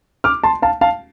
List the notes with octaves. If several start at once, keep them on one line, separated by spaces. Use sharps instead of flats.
D6 F6
A5 C6
F5 A5
F5 A5